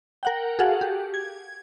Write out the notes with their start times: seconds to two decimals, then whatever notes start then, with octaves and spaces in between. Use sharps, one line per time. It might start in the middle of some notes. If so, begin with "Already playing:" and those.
0.23 A#4 F#5 G5
0.59 F#4 G#4 A4 F5 F#5
0.81 G4
1.14 G#6